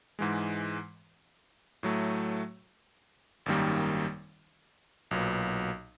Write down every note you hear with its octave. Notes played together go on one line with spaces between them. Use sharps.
G#2 E3 G#3
A2 F#3 A3
G#1 F#2 D#3 G3 A#3
B1 A#2 F#3 B3